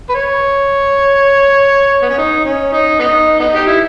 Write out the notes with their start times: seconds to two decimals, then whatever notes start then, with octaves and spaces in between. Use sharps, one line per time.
0.09 B4
0.15 C#5
2.02 B3
2.09 C#4
2.18 D#4
2.45 C#4
2.73 D#4
2.99 B3 D#4
3.40 B3 D#4
3.54 G4
3.66 E4